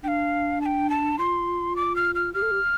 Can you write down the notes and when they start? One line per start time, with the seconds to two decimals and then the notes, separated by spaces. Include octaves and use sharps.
0.03 D4 G5
0.08 F5
0.61 A5
0.66 G5
0.90 A5
1.19 F4 C6
1.76 D6
1.96 F6
2.15 F6
2.34 G4 F6
2.42 A4
2.51 G4